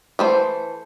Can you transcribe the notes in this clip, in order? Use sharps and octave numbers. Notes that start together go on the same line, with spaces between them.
E3 A3 C5